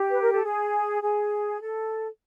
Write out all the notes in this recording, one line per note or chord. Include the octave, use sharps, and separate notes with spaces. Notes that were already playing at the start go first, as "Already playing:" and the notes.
Already playing: G4
B4
A#4
A4
G#4
G#4
A4